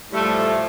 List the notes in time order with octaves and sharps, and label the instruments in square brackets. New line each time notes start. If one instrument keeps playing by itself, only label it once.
[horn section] A2 F3 G3 A3